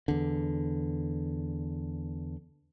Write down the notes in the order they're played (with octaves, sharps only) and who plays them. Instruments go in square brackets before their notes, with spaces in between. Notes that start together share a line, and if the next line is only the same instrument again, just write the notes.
[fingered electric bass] E2 D3